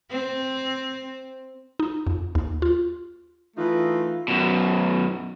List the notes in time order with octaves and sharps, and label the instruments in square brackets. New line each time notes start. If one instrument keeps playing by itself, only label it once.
[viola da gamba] C4
[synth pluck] D#4
F2
D#2
F4
[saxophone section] E3 A3 D#4 F4
[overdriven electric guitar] F#2 B2